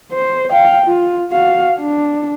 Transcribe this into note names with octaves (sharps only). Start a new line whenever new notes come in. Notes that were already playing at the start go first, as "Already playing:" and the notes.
C5
F5 G5
F4
F#4 F5
D4